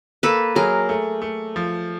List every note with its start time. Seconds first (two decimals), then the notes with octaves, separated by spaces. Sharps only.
0.23 A#3 A4 B4
0.55 F#3 G#4 A#4
0.89 A3
1.22 A3
1.56 F3